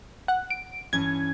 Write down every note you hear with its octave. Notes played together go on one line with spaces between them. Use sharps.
F#5
D7
G2 E3 C#4 G#6